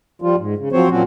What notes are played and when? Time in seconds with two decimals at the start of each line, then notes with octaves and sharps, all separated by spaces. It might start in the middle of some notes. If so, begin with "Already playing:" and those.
0.22 F3 G3 F4
0.38 G#2
0.57 C#3
0.72 F3 F#3 C4 C5 C#5
0.90 A#2 F3 F#3 C4 C#4 F#4